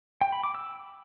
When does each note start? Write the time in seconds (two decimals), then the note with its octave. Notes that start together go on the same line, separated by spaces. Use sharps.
0.21 G5
0.32 B5
0.44 D6
0.55 E6